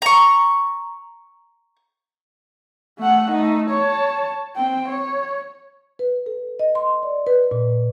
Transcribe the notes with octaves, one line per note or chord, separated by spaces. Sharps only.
A#5 C#6
A3 F#5
A3 D#4
C#5 A5
C4 G5
C#5
B4
A4
D#5
C6
D5
B4
A#2